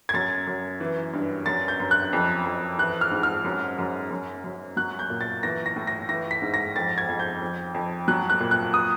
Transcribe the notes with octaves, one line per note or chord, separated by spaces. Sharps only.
G#6
F#2 A6
F#2
E3
G2
F#2 A6
G6
F#2
F#6
F2
F2
E3 F#6
F6
G#2
F6
F#2
F#2
F#2
F#2
F#3 F#6
G6
A#2
A6
E3 A#6
A#6
A2
A#6
E3 A#6
B6
G#2
A#6
F2 A6
G#6
F2
G6
F2
F2
F#3 F#6
F#6
A#2
F#6
D#6